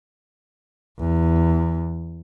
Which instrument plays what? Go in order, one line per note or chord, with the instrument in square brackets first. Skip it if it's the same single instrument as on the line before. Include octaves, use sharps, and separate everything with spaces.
[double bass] E2